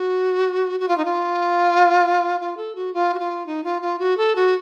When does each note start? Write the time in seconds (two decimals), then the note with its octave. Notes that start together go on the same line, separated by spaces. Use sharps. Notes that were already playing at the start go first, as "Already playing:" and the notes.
Already playing: F#4
0.80 F#4
0.88 F4
0.98 D#4
1.05 F4
2.40 F4
2.57 A4
2.75 F#4
2.94 F4
3.14 F#4
3.19 F4
3.46 D#4
3.64 F4
3.82 F4
3.99 F#4
4.17 A4
4.36 F#4